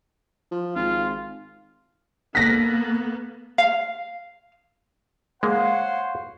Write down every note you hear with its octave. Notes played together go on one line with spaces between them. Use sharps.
F3
G#1 F4
A#3 B3 A4 A#6 B6
F5
G#3 A#3 C5 C#5 F5 F#5